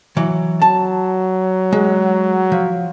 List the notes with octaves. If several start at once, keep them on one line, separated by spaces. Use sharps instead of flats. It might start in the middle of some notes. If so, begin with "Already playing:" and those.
E3 F#3
F#3 A5
G#3
F3